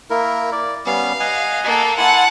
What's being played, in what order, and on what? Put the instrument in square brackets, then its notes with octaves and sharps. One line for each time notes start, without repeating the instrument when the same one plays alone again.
[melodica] A#3 E4 A#4
D5
[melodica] G3 B3 C#4 [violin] F5
[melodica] D#5 F#5 G#5
[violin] A#3 A4
[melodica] E4 G#5 C6 [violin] F#5 A5